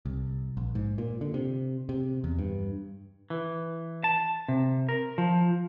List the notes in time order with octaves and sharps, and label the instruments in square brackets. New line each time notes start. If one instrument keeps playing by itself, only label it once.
[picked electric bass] C2
A#1
G#2
A#2
D3
C3
C3
E2
G2
[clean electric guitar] E3
A5
C3
A#4
F3